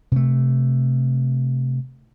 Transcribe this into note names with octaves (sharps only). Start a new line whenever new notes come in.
C3 A3